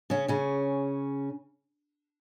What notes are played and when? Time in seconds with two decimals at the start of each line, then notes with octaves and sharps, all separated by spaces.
0.10 C#3 C#4
0.28 C#3 C#4